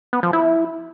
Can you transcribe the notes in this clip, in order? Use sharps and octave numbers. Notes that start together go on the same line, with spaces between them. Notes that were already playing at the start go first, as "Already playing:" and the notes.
B3
F3
E4